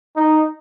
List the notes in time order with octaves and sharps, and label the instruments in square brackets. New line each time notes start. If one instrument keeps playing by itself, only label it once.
[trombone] D#4